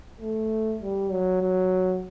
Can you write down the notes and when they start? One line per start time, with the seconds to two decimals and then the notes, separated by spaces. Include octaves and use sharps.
0.20 A3
0.82 G3
1.12 F#3
1.42 F#3